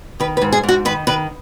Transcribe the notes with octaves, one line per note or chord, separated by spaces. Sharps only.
D#3 B4
B4
G#2
G#4
G#2
F#4
D#3 B4
D#3 B4